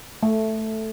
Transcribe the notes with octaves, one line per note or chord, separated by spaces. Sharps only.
A3